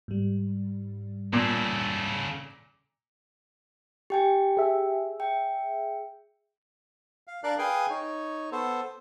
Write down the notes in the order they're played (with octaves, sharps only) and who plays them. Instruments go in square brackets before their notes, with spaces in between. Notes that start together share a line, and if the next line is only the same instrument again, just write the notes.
[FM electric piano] G#2 G3
[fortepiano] A#2 [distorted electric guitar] C#3 A4
[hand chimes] G4 G5 G#5
[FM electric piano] G#4 E5
[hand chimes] G5
[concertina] F5
D4 A#4 D5 F5 F#6
G#4 B4 F5 G5 G#5 D#6
D#4 C#5
B3 A4 C5